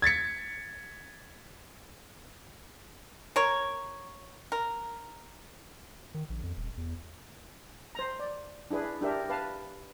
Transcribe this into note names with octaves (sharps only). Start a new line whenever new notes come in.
G#6 A6 B6 C#7
A#4 C#5
A#4
D#3
A#1
F2
D#1
E2
C5 A#5
D5
D4 E4 G#4 B4
D4 G4 A#4 E5
B4 F5 A5